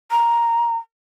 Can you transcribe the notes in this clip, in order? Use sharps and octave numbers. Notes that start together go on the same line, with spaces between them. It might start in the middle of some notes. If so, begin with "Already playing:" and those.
A#5